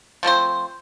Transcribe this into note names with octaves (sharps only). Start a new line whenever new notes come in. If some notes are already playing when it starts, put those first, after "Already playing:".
F3 A3 C4 C5